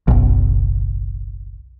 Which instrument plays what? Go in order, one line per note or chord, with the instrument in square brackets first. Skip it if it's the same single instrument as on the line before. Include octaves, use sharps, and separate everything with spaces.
[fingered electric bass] F#1 B1